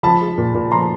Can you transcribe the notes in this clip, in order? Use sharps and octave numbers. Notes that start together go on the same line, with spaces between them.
F3 A5 B5
G#3
A#2
A#2
F3 A#5 C6